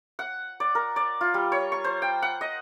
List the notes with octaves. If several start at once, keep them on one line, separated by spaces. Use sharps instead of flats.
F#5
D5
A#4
D5
F4
G3
C#5
C#6
C5
G5
F#5
D#5